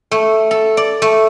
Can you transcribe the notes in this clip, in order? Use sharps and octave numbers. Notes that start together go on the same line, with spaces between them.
A3
A4
D5
A3